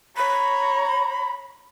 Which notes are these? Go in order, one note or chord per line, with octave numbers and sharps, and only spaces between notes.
C#5 A#5 B5